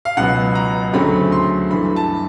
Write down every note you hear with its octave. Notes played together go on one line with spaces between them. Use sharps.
F5
C#2 B2 F#3 B3 F#5
A#5
D2 C#3 F#3 A3 C4 B5
C6
G2 E3 A3 B5
A5